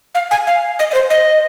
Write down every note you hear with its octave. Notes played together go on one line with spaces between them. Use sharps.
F5
G#5
F5
D#5
D#5
C5
D#5